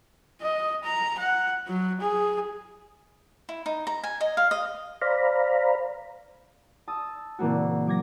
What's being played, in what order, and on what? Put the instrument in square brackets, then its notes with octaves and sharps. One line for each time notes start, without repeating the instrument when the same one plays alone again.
[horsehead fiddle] D#5
A#5
F#5
F#3
G#4
[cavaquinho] E4
D#4
A#5
G#5
D#5
F5
D#5
[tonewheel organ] C5 D5 F5 A#5 B5
[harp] A5 D#6 E6
A#2 C#3 E3 A#3 C4 F#4
F#3 D6 G#6 A#6